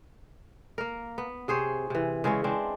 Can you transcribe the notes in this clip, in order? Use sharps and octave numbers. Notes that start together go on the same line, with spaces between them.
A#3 A#4
B3
C3 G#4 C5 C#5
C3 E3
C#3 G#3 E4 C#5
G#3 C4 D4